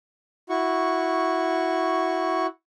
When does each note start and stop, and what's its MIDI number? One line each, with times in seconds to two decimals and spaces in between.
0.49 2.46 64
0.49 2.46 66
0.49 2.46 85